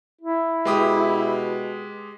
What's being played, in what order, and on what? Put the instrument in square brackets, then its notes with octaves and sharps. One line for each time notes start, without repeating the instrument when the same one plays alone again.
[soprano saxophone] E4
[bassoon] B2 [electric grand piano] G#3 G4 D#6